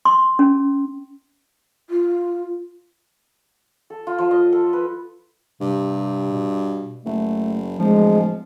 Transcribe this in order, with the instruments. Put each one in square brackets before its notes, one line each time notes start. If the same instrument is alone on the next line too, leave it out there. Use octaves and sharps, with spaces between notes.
[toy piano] C6
C#4
[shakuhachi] F4
[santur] A4
F4
F3
D#5
A4
B4
[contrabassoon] G2 [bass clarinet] C3
[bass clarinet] B2
[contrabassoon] F#1 [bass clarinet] A3
[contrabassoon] D1 [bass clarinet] F3 [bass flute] G#3